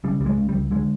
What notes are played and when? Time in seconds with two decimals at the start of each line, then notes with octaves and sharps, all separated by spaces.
0.04 C#3 G3
0.21 C#2 G3
0.26 G#3
0.37 C#3
0.49 G3
0.54 C#2
0.71 D3 G#3